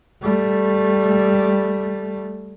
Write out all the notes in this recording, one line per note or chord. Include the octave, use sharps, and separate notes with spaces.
G3 A3